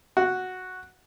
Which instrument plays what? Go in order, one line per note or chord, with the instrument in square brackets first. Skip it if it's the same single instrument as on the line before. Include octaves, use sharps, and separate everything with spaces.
[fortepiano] F#4